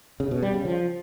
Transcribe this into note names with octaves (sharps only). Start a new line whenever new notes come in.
C#3
B2
G3
C#3
F3